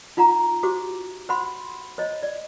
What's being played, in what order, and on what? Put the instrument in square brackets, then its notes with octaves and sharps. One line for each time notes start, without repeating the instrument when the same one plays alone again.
[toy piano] D#4 F4 F#5 A#5
F#4 G4 C5 D6
C5 F#5 B5 C6
C5 C#5 D#5
D5